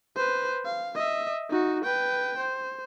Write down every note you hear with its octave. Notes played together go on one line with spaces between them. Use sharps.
B4 C5
F5
D#5 E5
D#4 F#4
B4 G5
C5